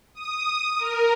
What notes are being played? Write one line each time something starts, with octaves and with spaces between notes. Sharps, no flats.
D#6
A#4